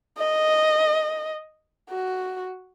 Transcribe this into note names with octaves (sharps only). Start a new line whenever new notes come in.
D#5
F#4